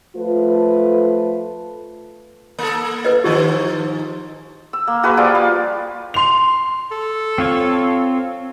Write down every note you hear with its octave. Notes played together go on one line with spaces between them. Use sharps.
F3 A3 F4 B4
A#3 A4
B4 D#5
G#2 D#3 F3 G4 D#5
E6
A#3
F#4 G#4 B4 E5
F3 G3 A#3 F4
F5
C6 F7
A4
C4 F4 C#5